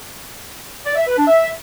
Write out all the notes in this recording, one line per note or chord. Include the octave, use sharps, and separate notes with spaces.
D5
E5
B4
D4
E5